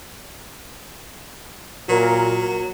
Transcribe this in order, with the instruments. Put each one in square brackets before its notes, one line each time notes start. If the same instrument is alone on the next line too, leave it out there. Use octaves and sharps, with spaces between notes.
[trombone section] A#2 A#4 [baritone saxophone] F#3